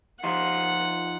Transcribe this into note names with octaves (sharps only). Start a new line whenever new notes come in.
F3 D#4 F4 F#5